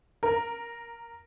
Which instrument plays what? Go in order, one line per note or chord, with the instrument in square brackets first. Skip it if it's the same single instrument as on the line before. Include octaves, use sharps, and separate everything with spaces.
[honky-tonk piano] A#4